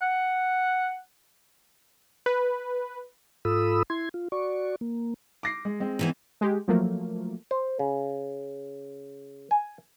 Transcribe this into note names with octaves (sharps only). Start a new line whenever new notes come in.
F#5
B4
G#2 F4 A4 B5 D#6 E6
E4 C6 G#6
F4
F#4 D5 C#6
A#3
D6 A#6 C7
G#3
G#3 C4
E2 E3 D#4
G#3 G4
F3 F#3 A3 A#3
C5
C#3
G#5